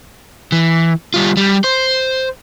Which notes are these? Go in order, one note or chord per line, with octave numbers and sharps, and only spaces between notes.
E3
G3 F4
G3
C5